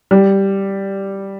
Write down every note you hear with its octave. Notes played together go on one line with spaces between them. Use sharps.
G3